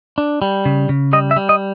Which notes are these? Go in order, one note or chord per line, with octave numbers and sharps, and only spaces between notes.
D4
G3
C#3
C#3
G3 D#5
E5
G3
D#5